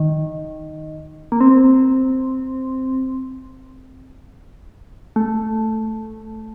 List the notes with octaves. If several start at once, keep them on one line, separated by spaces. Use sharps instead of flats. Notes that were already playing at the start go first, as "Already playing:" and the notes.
Already playing: D#3
A#3
C4
A3